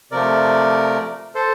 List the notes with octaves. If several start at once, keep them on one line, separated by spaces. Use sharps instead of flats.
C3 F3 A3 A#4 D5
A4 C5